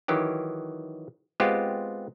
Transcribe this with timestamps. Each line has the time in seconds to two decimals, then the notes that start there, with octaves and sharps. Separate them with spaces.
0.08 D#3 E3 F#3 G4
1.40 G#3 B3 C4 F4 G4